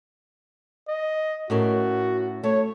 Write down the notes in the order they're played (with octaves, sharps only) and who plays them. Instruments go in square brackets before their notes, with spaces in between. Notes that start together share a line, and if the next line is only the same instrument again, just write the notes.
[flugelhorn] D#5
[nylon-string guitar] A2 C#4 A#4 [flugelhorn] F#4
[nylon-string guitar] A3 [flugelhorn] C#5